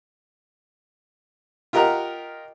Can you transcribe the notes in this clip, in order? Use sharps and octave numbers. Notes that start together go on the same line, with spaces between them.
F4 G4 A#4 D#5 F#5 A#5